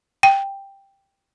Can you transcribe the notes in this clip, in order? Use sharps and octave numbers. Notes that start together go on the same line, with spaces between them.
G5